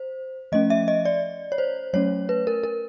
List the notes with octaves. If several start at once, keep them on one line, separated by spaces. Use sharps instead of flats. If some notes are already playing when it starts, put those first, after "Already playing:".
Already playing: C5
F3 A3 C#4 D#5
E5
D#5
D5
C#5
C5
F#3 A3 C#4 C#5
B4
A#4
A#4